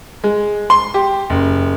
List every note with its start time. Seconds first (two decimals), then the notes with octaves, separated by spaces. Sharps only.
0.24 G#3
0.70 C6
0.94 G4
1.30 F#1